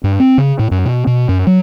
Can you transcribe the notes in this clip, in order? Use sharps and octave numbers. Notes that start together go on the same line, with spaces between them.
G2
C4
C#3
A2
F#2
B2
B2
F#2
F#3